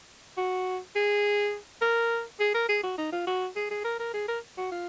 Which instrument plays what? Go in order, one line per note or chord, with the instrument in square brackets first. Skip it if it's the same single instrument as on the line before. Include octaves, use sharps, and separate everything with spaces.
[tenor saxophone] F#4
G#4
A#4
G#4
A#4
G#4
F#4
D#4
F4
F#4
G#4
G#4
A#4
A#4
G#4
A#4
F#4
F4